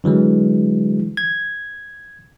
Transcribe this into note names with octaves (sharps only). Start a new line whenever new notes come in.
D3 E3 F#3 G#3
G#6